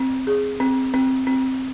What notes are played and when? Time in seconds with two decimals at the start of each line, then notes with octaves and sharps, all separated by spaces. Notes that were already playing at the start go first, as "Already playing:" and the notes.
Already playing: C4
0.27 G#4
0.60 C4
0.94 C4
1.27 C4